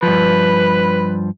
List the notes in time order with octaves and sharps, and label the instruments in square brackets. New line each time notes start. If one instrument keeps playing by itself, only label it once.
[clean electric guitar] G2 F3 [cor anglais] B4